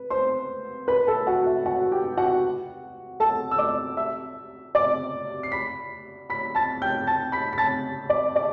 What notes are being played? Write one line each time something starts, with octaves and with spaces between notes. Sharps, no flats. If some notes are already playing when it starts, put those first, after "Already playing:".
Already playing: B4
C5 C6
B4 B5
A4 A5
F#4 F#5
E5
F#4 F#5
G4 G5
F#4 F#5
A4 A5
E6
D5 D6
E5 E6
D5 D6
C7
B5 B6
B5 B6
A5 A6
G5 G6
A5 A6
B5 B6
B6
A5 A6
D5 D6
D5 D6